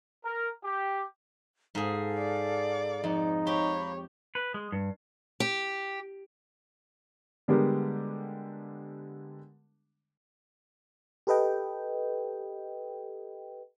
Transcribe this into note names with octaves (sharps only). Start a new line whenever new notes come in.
A#4
G4
G#2 G#4 A4 F5
D5
F2 D#4
G4 C#5 F5 A#5 B5
B4
G#3
G2
G4
D3 G3 G#3 B3 G4 A#4
G4 A4 B4 D#5 G5